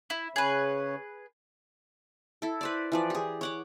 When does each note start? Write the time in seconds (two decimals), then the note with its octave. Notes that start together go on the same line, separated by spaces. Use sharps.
0.10 E4
0.36 C#3 C#4 G#4 B4 C#5
2.42 E4 A4
2.61 B4 C5 D5
2.92 E3 F3 D5
3.10 G4 G#4
3.41 C#5 F#5 D6